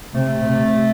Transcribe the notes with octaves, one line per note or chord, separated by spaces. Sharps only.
C3 A3
C3